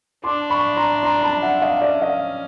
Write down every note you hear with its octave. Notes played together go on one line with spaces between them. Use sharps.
D4 C6 D6
B5 C#6
A#5 C6
A#5 C6
A5 B5
E5 F#5
D#5 F5
C#4 D5 E5
D#5 F5